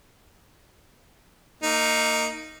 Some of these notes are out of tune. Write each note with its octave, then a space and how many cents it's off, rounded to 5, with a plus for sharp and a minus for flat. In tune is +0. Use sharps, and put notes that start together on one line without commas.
A#3 -25 D#4 +0